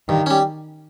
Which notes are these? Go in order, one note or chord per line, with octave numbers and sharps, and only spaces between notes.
G2 D#3
G3 C#4